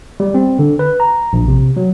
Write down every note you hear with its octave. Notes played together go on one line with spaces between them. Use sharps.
G3
C4
D3
B4
A#5
A#1
C3
F#3